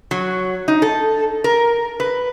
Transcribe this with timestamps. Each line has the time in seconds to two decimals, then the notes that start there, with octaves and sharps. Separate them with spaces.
0.11 F#3
0.68 D#4
0.82 A4
1.44 A#4
2.00 B4